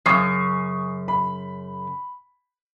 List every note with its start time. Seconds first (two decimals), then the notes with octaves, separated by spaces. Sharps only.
0.06 F#2 C#3 C#6 D#6 C7
1.08 B5